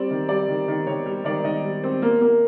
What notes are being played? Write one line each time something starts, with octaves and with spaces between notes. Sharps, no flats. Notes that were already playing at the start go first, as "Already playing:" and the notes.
Already playing: G3 C4 D5
D#3
G3 D5
D#3
D#3
D#3 C#5
G3
D#3 D5
D#3 D#5
G3
C4
A#3
A#3